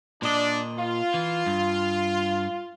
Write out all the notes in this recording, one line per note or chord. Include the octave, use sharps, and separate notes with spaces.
A#2 D4 D#5
F4
E3
G2